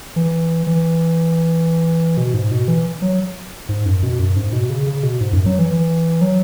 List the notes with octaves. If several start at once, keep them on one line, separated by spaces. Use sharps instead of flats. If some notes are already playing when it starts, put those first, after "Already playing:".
E3
E3
B2
G#2
B2
E3
F#3
G#2
F#2
B2
F#2
G#2
B2
C#3
C#3
B2
G#2
F#2
F#3
E3
E3
F#3